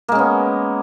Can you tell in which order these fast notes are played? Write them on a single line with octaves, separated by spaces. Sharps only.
A#3 G#3 C#4 B3